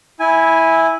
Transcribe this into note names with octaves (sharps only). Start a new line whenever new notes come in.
E4 G#5